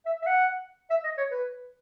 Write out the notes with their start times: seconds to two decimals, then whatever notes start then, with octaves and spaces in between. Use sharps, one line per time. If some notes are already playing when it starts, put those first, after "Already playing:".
0.06 E5
0.22 E5
0.26 F#5
0.90 E5
1.04 D#5
1.17 C#5
1.31 B4